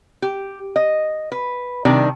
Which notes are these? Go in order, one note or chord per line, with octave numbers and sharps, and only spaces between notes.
G4
D#5
B4
C3 D#3 G3 D4